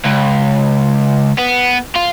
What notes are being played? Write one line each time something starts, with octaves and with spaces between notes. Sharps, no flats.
C#2
B3
F4